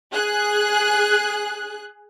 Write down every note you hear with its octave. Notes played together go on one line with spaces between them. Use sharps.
G#4 F#6